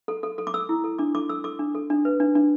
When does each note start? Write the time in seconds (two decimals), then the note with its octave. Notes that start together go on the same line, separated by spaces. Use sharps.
0.08 A4
0.23 A4
0.38 A4
0.47 D6
0.54 A4 E6
0.69 E4
0.84 A4
0.99 D4 D6
1.15 A4 D6
1.29 A4 E6
1.44 A4 D6
1.59 D4
1.75 A4
1.90 D4
2.05 B4
2.20 D4
2.35 D4